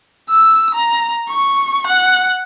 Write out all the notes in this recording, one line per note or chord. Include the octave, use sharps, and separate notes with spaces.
E6
A#5
C#6
F#5